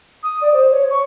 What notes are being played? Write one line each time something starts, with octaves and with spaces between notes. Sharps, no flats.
D#6
D5
C5
C#5
C#6